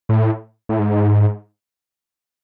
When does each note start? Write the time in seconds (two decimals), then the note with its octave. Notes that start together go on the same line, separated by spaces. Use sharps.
0.09 A2
0.69 A2
0.79 G#2